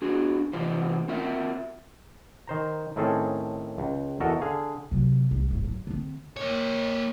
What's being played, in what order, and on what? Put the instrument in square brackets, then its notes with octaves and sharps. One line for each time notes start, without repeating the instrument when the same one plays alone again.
[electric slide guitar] D4 F#4 G#4
C3 E3 F4 G4 C5
C4 F4 A#4 E5
[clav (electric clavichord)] D#3 C5 A#5
A2 D#3 C4 C#4 G#4 A4
C#2
E2 F#4 A4 A#4 D#5
D3 G#4 F5
[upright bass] C3 F#3
C2
D1 G1
F#3
D3 C4
[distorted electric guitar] A#3 C#5